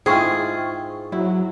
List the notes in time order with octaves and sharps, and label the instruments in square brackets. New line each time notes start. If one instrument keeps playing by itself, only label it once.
[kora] G#2 E4 F4 [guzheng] G#4 [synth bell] C5 G5 C#6
[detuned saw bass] F#3 [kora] E4